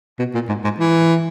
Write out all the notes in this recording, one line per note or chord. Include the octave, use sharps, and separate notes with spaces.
B2
A#2
G#2
G#2
E3